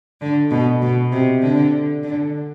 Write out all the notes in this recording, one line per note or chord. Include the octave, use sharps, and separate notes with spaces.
D3
B2
B2
C3
D3
D3